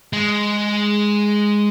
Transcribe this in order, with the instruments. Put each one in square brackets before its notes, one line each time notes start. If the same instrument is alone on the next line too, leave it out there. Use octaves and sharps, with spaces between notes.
[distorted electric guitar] G#3